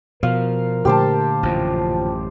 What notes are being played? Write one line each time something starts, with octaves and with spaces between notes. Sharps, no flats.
B2 F3 A#4 F5
A#2 D3 A3 G4 C5 A5
A1 F#2 F3